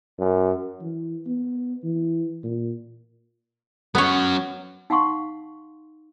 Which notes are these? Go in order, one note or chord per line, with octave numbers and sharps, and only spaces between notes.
F#2
E3
B3
E3
A#2
F#3 B3 C#4 C#5
D#4 F5 F#5 C6 C#6